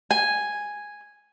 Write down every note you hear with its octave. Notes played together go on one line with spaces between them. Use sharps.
G#5